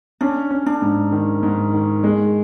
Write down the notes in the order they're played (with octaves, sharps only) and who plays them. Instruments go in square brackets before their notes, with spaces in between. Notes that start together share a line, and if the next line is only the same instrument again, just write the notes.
[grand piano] C#4 [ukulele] D4
[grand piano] C#4
[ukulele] D4
[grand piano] G#2
D#3
G#2
D#3
G#3